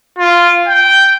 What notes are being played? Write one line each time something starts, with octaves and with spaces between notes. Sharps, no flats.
F4
G5